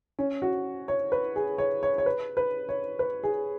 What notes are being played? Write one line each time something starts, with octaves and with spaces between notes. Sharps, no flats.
C#4
F#4
C#5
B4
G#4
C#5
C#5
C#5
B4
B4
C#5
B4
G#4